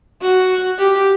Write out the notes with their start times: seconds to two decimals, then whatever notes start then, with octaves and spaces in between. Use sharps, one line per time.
0.21 F#4
0.79 G4